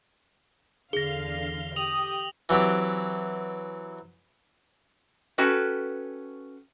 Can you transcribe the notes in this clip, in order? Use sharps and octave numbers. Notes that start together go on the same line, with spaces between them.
E2 D3 G#4 F5 A#6 G7
G4 D#6 F7 F#7
E3 F#3 C4 G4
C#4 F#4 A4 B4 G5